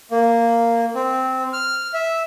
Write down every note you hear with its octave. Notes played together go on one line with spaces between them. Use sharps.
A#3
C4
F6
E5